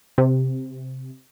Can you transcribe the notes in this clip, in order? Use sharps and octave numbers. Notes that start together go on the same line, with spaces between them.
C3